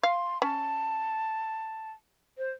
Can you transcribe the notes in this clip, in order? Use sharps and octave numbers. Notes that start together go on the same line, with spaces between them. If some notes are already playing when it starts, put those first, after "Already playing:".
F5 C6
C#4 A5
C5